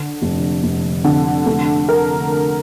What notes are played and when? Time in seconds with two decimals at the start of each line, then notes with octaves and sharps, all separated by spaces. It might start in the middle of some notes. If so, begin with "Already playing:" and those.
Already playing: D3
0.22 F1
0.63 F1
1.04 D3
1.46 A3
1.89 A#4